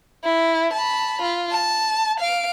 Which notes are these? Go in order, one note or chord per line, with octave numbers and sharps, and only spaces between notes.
E4
A5 B5
F4
A5
F5 D7